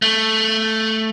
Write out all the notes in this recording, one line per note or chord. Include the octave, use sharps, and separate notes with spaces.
A3